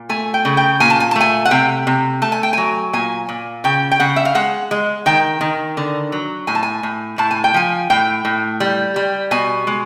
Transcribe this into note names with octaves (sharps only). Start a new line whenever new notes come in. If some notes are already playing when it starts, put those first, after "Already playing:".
Already playing: A#2
A3 G#5
G5
C#3
G5
A#2 G#5
A5
G#5
A5
A3 G#5
F#5
C3 G5
C3
A3 A5
G#5
G5
F#3 G#5
A#2 G#5
A#2
C#3 G5
G5
C#3 F#5
E5
F5
G#3 F#5
G#3
D#3 G5
D#3
D3
F#3
A2 G#5
A5
G#5
A2
A2 A5
G#5
G5
F3 G#5
A2 G5
A2
G3
G3
B2 G#5
G#3